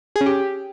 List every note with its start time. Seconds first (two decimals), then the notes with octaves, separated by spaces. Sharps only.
0.16 G#4
0.21 C#4
0.26 G4